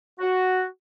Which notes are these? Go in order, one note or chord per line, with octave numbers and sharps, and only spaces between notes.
F#4